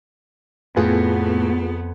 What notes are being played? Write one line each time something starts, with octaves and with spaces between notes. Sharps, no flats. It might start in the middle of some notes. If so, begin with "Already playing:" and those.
F2 A2 B3 F4 G#4 B4